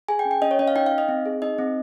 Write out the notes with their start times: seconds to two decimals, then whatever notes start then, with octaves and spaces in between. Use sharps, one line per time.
0.09 G#4 G#5
0.19 G5
0.25 C#4
0.31 G5
0.42 C#4 D#5
0.51 C#5
0.59 C#4 D#5
0.68 F5
0.75 D#4 G5
0.86 F5
0.92 D#4
0.98 D#5
1.08 C4
1.26 G#4
1.42 D#4 D#5
1.58 C4